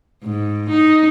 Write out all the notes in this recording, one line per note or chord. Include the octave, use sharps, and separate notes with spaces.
G#2
D#4